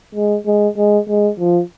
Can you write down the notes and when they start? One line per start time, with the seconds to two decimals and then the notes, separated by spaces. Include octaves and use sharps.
0.15 G#3
0.46 G#3
0.77 G#3
1.08 G#3
1.39 F3